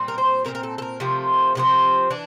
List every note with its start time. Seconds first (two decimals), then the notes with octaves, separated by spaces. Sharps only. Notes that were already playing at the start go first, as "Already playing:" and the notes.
Already playing: A#2 G3 C4
0.08 A#4
0.18 C5
0.45 A#2 G3 C4 A#4
0.55 A#4
0.63 A4
0.78 A4
0.82 A#4
1.00 C3 F3 A3 C4
1.55 C3 F3 A3 C4
2.10 E3 D4